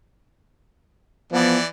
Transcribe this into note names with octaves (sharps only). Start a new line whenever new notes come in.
E3 F3 B3 D5